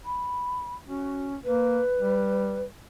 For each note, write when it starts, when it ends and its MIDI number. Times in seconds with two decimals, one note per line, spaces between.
0.04 0.73 83
0.88 1.37 61
0.88 1.26 66
1.44 1.80 58
1.44 2.62 71
1.99 2.66 55